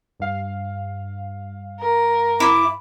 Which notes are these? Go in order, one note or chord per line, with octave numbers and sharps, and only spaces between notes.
G2 F5
A#4
E4 D6